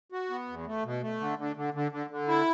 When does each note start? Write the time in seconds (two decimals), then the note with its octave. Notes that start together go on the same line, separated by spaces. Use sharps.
0.12 F#4
0.30 B3
0.48 E2
0.66 A3
0.84 B2
1.02 A3
1.20 D3
1.38 D3
1.56 D3
1.74 D3
1.92 D3
2.10 D3
2.28 E4